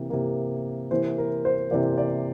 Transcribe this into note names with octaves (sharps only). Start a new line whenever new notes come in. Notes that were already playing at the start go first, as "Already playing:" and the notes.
Already playing: C3 E3 A#3
C3 E3 A#3
C3 E3 A#3 C5
A#4
C5
C3 E3 A#3 D5
D5